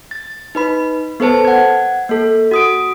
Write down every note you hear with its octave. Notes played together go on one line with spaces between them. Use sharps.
A6
D#4 B4 B5
B3 A4 B4 C5 A5
F#5 G#6
A#3 A4
F#4 D#6 D7